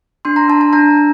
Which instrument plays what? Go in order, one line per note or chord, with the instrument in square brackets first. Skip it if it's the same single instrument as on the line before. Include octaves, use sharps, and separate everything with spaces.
[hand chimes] D4 C6
A#5
D4 A5
A5
D4 A#5
D4